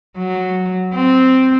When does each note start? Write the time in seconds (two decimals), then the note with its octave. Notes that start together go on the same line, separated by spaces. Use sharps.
0.18 F#3
0.95 C4